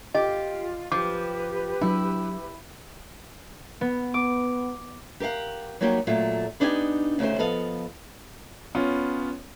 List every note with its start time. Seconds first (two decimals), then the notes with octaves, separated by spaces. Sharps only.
0.14 F4 G4 D#5
0.92 F3 G4 B4 D6
1.81 F#3 D4 E4
3.81 B3
4.14 B3 D6
5.20 G4 A#4 C5 F5 F#5
5.81 F#3 G3 A#3 D#4 F#4 G4
6.07 A#2 F#3 A3 F4
6.60 B3 D4 D#4 G4 F#5 G#5
7.19 D2 C#3 A3 D#4 C5
7.38 F3 B3 A4 D#5 F5
8.75 B3 C#4 F4